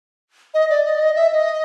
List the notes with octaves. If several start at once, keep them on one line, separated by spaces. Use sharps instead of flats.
D#5
D5
D#5
D5
D#5
E5
D#5